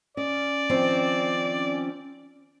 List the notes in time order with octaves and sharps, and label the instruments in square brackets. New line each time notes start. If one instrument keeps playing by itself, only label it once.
[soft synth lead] C#4 [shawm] D5 [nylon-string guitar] D#5
[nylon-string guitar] D#3 F3 C4